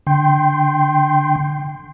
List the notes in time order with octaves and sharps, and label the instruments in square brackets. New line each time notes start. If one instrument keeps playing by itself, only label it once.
[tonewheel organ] D3 G5 C6